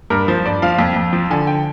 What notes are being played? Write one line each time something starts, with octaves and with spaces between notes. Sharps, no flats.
G2 A#4
F3 C5
G2 D5
F3 F5
F2 G5
F2
F3
D3 G#5
G5